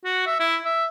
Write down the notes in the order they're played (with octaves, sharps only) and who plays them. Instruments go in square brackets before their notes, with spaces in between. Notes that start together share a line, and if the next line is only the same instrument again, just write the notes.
[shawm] F#4
E5
E4
E5